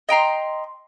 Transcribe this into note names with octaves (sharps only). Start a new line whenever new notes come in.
D#5 G5 A#5 C6